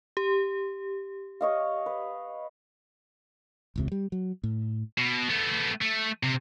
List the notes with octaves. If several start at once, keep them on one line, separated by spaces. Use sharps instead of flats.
G4
C#5 D#5 F5
B4
E1 C#2 C3
G3
F#3
A2
B2
A3 B3
A3
C3